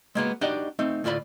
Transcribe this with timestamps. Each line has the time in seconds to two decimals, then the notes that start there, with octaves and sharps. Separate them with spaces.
0.15 G#3 A#3 B3 F#4
0.41 D4 D#4 F#4 G4 D#5 F#5
0.79 A3 C4 D#4
1.04 D2 A2 F4 D5 B5